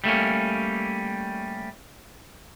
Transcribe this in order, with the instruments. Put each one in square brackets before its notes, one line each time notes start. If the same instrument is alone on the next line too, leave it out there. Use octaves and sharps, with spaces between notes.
[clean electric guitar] G3 A3 A#3 C#4